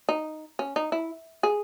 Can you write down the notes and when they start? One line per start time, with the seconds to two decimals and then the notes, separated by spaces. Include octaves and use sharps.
0.09 D#4
0.59 C#4
0.76 D#4
0.92 E4
1.43 G#4